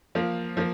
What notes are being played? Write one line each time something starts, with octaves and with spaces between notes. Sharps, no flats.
F3 A#3 F4
F3 A#3